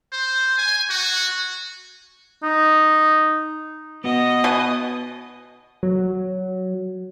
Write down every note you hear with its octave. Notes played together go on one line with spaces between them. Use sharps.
C5
G#5
F#4
D#4
B3 F#4 D#5
B2 G#5
F#3